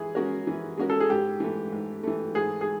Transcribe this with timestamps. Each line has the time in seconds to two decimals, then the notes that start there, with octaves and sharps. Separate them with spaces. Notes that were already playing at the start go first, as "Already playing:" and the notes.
Already playing: E3 G#3 G#4
0.15 G#3 C#4 F#4 A#4
0.47 E3
0.78 G#3 C#4 F#4 A#4
0.90 A4
1.00 G#4
1.09 G#2 G4
1.40 E3 A3
1.72 G#2
2.03 E3 A3
2.35 G#2 G#4
2.61 G#4